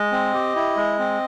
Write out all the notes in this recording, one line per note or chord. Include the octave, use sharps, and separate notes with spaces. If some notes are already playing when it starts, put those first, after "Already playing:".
Already playing: G#3 D#5
C4
G4
E4
G#3
C4